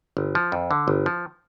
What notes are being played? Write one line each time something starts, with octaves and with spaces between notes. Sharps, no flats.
G1
F3
F2
D3
G1
F3